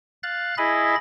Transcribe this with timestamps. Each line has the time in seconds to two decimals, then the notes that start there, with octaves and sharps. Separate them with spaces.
0.23 F5 F#6 A6
0.58 E4 G#4 D#5 B5 A6